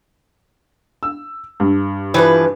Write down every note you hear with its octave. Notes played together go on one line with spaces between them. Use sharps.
E6
G2
E3 F3 B4